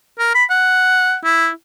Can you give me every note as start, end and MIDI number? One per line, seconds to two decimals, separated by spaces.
0.19 0.31 70
0.35 0.44 83
0.50 1.15 78
1.24 1.49 64